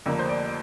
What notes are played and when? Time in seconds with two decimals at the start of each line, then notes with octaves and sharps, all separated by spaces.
0.06 F1 F2 D3 A#3
0.19 C5
0.29 D5